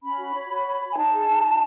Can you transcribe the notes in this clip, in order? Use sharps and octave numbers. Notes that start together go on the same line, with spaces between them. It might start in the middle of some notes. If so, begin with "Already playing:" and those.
C#4 B5
F#4
C#5
F#4
C#5
C#5
G#5
D#4 A5
G#4
D#4
F#4